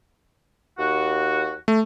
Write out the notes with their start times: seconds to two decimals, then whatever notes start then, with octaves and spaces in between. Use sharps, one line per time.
0.78 D#2 F#4
1.68 A3